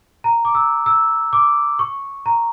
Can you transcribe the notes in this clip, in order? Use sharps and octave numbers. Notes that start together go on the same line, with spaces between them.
A#5
D6
E6
E6
D6
C#6
A#5